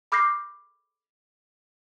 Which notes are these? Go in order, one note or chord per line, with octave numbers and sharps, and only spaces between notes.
B5 D6 F6 G6 A#6 C7